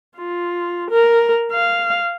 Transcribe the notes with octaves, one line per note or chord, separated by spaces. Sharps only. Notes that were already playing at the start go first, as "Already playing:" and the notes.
F4
A#4
F5